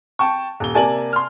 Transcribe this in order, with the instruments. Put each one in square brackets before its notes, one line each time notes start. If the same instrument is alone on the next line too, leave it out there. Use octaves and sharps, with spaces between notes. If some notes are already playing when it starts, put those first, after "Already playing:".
[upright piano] G5 A5 C#6
D#1 G7
[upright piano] C3 A#3 F#7 [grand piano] D5 G#5 A5
[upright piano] C6 F6